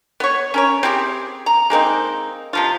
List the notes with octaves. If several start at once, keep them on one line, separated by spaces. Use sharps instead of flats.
B3 C#5
C#4 A#4 C#5
C4 E4 G4 G#4
A#5
G#3 A#3 C4 D#4
C3 F3 F4